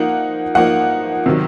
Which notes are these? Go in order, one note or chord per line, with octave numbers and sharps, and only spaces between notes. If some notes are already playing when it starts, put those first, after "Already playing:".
Already playing: F3 A#3 D#4 F#5
F3 A#3 D#4 F#5
C3 D#3 F#3